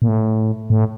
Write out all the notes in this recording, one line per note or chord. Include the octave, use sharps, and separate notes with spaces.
A#2
A2
A2